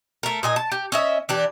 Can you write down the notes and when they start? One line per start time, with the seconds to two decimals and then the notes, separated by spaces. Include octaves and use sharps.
0.23 A3 A#4
0.43 A#2 D#5 G#5
0.56 A5
0.72 G4
0.92 C#4 D#5 E5
1.29 E3 D4 G4